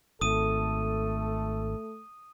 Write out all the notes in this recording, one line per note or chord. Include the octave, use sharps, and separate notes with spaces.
G#1 A3 A4 D#6 D#7